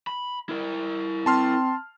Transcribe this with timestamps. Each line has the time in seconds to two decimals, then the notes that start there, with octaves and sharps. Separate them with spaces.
0.07 B5
0.49 E4 A#4
1.26 C4 A5 C6 F6